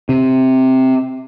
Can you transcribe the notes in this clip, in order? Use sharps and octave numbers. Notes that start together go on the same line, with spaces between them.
C3